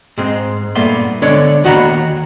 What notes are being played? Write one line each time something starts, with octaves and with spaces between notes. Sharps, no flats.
G#2 G#3 C4
G2 A#2 A3 B3 C6
D3 G#3 B3 D4 C#5 D5
D#2 D#3 F#4 F#5 A#5 B5